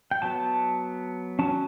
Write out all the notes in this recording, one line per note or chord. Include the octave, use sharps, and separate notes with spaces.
G5
F#3 B3 A5
F#3 C#4 A5